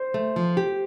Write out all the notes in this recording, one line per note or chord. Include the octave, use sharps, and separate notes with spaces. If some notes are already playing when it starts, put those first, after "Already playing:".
Already playing: C5
A3
F3
G4